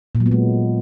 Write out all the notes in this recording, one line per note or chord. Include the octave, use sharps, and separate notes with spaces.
A#2
F#3
B3
G#3